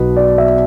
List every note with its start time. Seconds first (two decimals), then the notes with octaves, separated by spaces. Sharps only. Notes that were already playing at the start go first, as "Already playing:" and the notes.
Already playing: B1 B2 B3 B4
0.16 D5
0.38 E5